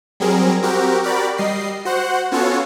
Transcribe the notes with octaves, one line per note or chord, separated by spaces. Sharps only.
F#3 G3 C4 G#4 A#4
C4 F#4 G4 A#4
F#4 G4 A#4 D5 B5
G3 D#5 C7
F#4 C5 F#5
B3 C#4 F4 F#4 A4 C#5